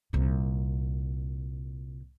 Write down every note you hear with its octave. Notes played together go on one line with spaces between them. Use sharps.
C2 A#2